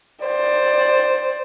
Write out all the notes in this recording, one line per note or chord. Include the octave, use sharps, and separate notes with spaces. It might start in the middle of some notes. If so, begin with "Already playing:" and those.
C5 D5